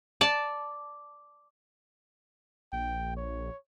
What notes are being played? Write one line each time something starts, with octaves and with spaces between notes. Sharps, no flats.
D5 A5
A#1 G5
C#5